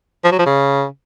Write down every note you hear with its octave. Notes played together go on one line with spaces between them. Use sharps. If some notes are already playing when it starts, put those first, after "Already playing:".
F3
F#3
F3
C#3